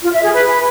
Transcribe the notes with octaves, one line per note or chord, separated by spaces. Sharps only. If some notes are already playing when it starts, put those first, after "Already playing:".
F4
E5
G#4
B4